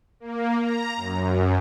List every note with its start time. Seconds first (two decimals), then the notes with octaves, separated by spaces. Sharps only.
0.20 A#3
0.61 A#5
0.96 F#2